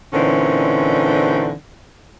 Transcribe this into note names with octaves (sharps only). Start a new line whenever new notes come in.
A#2 D3 E3 C4 C#4 D#4